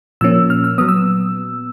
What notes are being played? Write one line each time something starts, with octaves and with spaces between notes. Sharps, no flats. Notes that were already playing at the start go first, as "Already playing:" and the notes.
A#2 F3 A#3 C#4 E6
F6
E6
A#2 F#3 B3 D#6
E6